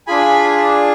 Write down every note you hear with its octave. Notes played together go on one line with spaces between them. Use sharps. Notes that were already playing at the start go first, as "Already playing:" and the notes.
D4 F4 G#4 G#5 B5